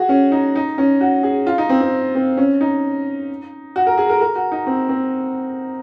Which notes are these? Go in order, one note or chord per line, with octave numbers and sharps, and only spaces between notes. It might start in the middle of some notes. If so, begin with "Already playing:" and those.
Already playing: F#4 G#4
C#4
D#4
D#4
C#4
F#4
G#4
F4
D#4
C4
C4
C4
C#4
D#4
F#4
A#4
G#4
A#4
A#4
F#4
D#4
C4
C4